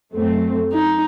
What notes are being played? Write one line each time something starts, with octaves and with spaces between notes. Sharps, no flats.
F#2 F#3 A3 C4
D#4